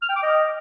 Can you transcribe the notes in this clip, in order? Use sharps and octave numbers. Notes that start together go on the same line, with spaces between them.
F6
G5
D6
D#5